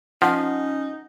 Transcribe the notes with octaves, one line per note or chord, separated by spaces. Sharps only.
F3 C#4 D#4 F#5